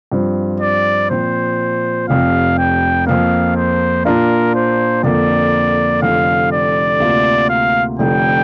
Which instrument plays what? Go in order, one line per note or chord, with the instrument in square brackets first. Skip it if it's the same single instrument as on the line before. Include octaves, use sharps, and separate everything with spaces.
[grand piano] G2 F3 C4
[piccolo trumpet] D5
[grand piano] A#2 F3 C4 [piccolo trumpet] C5
[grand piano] F1 F2 C3 [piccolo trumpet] F5
[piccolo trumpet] G5
[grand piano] F2 F3 A#3 [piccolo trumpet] F5
[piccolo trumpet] C5
[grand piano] A#2 A#3 D4 F4 [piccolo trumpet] A#4
[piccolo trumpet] C5
[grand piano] F2 D3 A#3 [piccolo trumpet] D5
[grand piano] F1 F2 D3 [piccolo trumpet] F5
[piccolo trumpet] D5
[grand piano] D2 C3 A#3 F4
[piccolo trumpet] F5
[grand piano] F1 F2 D3 [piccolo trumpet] G5